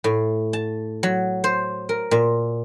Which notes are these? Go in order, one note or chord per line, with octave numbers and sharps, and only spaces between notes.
A2
A5
F#3
C5
A#4
A#2